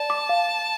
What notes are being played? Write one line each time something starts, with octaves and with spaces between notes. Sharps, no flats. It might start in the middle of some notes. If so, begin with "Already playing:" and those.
Already playing: D5 A5
D6
F5